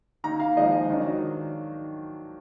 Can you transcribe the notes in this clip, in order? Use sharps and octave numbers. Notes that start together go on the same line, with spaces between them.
D#3 A#3 D#4 A#5
F5
F3 G#3 D#4 D#5
D#3 F#3 D4